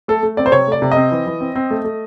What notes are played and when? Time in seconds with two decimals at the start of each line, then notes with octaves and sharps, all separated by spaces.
0.08 A3 A4
0.23 A3
0.37 C4 D5
0.46 C5
0.52 C3 C#5
0.68 A3 D5
0.82 C3
0.91 D#5
0.97 C4
1.12 E3
1.26 E3
1.41 C4
1.55 C4
1.71 A3
1.84 A3